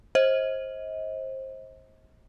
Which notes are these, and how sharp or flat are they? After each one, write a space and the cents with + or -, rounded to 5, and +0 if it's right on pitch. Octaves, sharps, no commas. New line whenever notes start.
C5 +25 D#5 +35